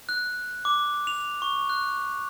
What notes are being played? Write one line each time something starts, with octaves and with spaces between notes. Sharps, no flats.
F#6
D6
F7
C#6
F#6